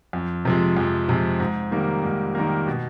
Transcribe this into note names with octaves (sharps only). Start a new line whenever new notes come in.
F2
C3 F3 G#3
F2
C3 F3 G#3
G#2
D#3 G3 A#3
G#2
D#3 G3 A#3
B2